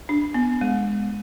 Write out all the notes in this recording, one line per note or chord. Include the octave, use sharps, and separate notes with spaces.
D4
B3
G#3